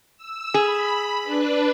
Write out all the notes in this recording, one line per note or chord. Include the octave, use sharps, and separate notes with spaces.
E6
G#4 B5
D4 B4